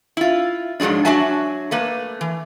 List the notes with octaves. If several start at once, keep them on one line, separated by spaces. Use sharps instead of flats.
E4 F4
G#2 F3 F#3 G#3 D4
F#3 D4 F#4 E5 G#5 A5
A3 A#3 B4
E3